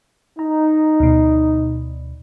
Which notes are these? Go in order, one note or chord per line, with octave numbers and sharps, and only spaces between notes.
D#4 A#5
D2 B2